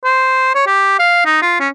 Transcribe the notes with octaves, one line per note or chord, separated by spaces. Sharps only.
C5
C#5
G4
F5
D#4
F4
C#4